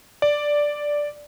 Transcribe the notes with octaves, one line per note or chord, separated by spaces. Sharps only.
D5